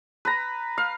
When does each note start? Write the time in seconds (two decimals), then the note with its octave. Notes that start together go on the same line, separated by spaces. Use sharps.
0.25 B4 A#5
0.78 F5